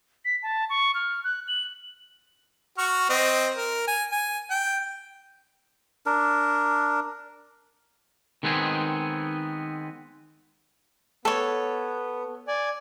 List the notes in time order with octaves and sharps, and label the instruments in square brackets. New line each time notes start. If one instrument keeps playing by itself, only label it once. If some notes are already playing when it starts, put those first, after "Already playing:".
[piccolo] B6
A5
C#6
F6
F#6
F#7
[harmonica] F#4 C#6 F6
C4 D#5
A#4
G#5
G#5
G5
[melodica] D4 A#4
[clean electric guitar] D#3 G#3 B3 C4 G#4
[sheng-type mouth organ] B3 [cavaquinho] A4 C#5
[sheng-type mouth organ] D5 G#5